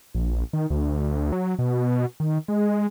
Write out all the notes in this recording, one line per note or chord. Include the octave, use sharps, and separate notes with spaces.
A#1
D#3
D2
F#3
B2
D#3
G#3